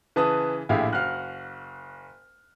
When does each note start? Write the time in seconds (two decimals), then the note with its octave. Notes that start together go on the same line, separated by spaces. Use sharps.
0.16 C#3 E3 B4 A5 D#6
0.69 A#1 A2 E4 G4 G#4 F5
0.93 F#1 F#4 F5 F6 F#6